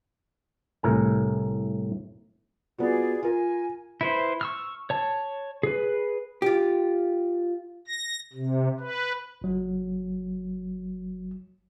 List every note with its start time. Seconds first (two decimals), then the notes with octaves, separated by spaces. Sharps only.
0.83 C2 A2 A#4 G#5
2.78 B3 F4 F#4 G#4 D5
3.23 F4 A#4 G#5
4.01 E4 B4 C5
4.41 C#6 E6 F6
4.90 C#5 A5
5.63 G#4 B4
6.42 F4 G4
7.87 A#6
8.33 C3
8.80 B4
9.42 G1 F#3